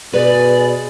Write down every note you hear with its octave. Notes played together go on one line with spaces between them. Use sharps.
B2 G#4 B4 D5